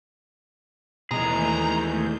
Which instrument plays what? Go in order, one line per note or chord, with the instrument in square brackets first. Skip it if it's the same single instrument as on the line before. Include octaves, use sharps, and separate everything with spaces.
[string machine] D#2 A3 G6 [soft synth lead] B2 [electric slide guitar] E3 G#3 G#4 [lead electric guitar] A#5